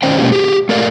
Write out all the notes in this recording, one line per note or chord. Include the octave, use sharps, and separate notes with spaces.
D#3 C#4 C5 D5 G5
B2 G#3 A#3 C#4 D4 G4
G4 G#4
A3 A4 A#4 D5 E5 F5